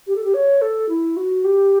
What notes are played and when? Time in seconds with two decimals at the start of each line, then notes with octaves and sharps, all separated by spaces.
0.07 G4
0.16 A4
0.24 G4
0.34 C#5
0.62 A4
0.89 E4
1.17 F#4
1.44 G4